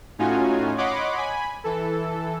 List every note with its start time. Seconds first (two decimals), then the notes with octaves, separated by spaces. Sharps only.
0.19 A2 C#4 D#4 F4 F#4 G#5
0.78 C#5 D#5 F#5 B5 C6 D6
1.16 G#5 B5
1.64 E3 A4